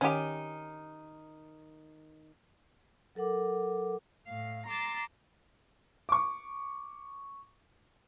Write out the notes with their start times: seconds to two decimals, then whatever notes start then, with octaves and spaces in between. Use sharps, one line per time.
0.01 D#3 C#4 D#4 G4
3.15 F#3 A4 A#4 F#5 D6
4.27 A2 F5
4.66 A#5 C6 D6 E6 A6
6.09 C#6 D6